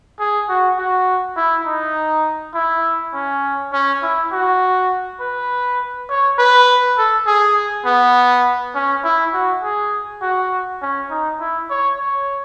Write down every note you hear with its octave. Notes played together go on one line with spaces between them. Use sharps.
G#4
F#4
F#4
E4
D#4
E4
C#4
C#4
E4
F#4
B4
C#5
B4
A4
G#4
B3
C#4
E4
F#4
G#4
F#4
C#4
D#4
E4
C#5
C#5